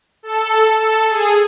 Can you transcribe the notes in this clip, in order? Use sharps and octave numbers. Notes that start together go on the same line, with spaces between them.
A4
A4
G#4